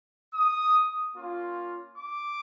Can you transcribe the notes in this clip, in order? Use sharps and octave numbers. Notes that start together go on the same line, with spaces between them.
D#6
A#3 C#4 F4
D6